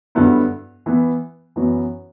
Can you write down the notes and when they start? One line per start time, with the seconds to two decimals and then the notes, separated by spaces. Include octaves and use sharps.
0.15 G2 D3 F#3 B3 E4
0.86 E3 B3 E4
1.56 F#2 E3 B3 F#4